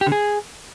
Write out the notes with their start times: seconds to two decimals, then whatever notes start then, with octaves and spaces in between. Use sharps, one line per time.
0.01 G4
0.07 D3
0.12 G#4